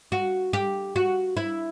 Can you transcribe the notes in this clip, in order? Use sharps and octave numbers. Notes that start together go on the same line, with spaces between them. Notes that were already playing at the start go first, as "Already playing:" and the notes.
F#4
G4
F#4
E4